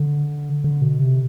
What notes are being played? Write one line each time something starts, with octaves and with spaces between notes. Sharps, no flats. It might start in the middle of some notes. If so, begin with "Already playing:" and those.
Already playing: D3
D3
B2
C3